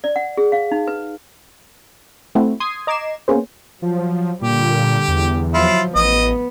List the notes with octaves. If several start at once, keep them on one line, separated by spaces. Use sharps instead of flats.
D5
F#5
G#4
F5
D#4
B4
A3 C4 E4 F#4
C6 D#6 G#6 C7 D#7
D#5 A#5 D6 G#6 C7 E7
A#3 B3 C#4 G#4 C5
F3 F#3
A#2 D3 G3 G4
E2
F3 F#3 E4 F4
A1 B3 D#5